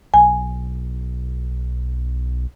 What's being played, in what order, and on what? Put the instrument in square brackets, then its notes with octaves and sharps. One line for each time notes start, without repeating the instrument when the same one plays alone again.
[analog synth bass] B1 [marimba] G#5